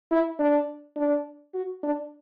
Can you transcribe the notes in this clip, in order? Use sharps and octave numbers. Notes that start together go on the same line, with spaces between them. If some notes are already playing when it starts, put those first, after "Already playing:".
E4
D4
D4
F#4
D4